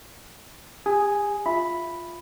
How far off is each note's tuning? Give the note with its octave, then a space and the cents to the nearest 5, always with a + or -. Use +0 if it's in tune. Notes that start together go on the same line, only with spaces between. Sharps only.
G4 +45 G#5 +0 D#6 +0
F4 +0 E5 +0 B5 +0